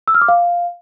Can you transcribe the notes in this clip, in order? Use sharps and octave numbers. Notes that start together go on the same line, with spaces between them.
E6
F6
D6
F5